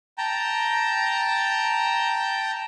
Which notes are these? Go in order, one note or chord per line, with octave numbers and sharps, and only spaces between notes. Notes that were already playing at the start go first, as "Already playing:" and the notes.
G5 A5 A#5